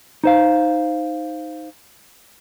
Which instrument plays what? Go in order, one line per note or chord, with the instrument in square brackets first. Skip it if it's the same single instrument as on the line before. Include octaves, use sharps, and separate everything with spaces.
[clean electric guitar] D#4 C5 F5